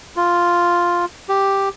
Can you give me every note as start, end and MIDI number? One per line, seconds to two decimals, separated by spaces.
0.17 1.05 65
1.29 1.69 67